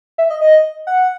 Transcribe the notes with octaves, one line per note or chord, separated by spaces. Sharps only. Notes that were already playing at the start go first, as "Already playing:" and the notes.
E5
D#5
D#5
F#5